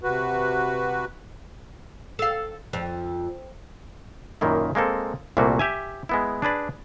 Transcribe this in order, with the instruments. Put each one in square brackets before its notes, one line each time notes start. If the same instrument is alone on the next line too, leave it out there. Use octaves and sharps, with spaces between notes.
[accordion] C3 F#4 B4
[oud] A4 F5
F2
[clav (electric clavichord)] F#2 A#2 D#3 A#3 E4
G#3 A#3 C4 A4
C2 A#2 G3 A3 A#3 F#4
G4 E5 G#5
G#3 B3 E4
D4 G#4 B4 D5